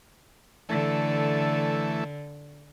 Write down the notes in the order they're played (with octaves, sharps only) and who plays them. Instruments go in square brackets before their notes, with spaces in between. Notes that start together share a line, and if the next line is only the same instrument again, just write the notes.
[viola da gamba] D3 [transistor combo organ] E3 A3